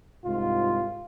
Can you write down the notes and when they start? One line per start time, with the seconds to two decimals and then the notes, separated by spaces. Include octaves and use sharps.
0.25 C2 G#2 F4